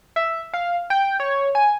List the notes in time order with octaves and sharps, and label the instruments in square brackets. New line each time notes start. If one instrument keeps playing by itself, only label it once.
[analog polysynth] E5
F5
G5
C#5
G#5